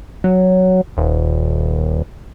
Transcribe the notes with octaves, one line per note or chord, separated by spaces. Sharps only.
F#3
D#1